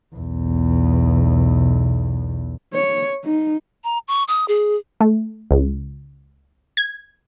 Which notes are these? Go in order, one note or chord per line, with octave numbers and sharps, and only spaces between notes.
B1 E2
C#5
D#4
A#5
C#6
D#6
G#4
A3
C#2
G#6